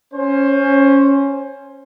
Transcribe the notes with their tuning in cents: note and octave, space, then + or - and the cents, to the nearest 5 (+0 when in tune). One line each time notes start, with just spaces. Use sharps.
C#4 +0 C5 +20